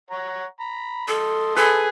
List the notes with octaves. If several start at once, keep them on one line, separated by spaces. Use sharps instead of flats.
C#5 F#5 A#5
A#5 B5
A4 D#5 A5 C6
G#4 A4 B4